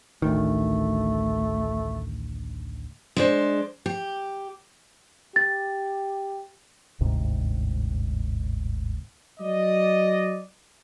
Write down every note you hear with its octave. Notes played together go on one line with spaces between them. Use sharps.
A1 D2 D#3 A3
G#3 D4 C5
G4
G4 A6
G1 D2 G#2 C3
F#3 D5 D#5